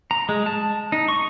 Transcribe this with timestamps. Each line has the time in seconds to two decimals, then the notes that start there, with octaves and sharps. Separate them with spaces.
0.11 A#5
0.29 G#3
0.46 A5
0.92 D#4
1.08 C#6